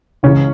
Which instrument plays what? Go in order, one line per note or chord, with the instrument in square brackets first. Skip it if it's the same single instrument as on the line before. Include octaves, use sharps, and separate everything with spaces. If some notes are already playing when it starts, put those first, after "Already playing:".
[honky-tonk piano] C#2 C#3 E3 G#3 C#4 C#5